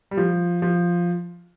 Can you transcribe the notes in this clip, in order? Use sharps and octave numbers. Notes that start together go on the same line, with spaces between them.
G3
F3
F3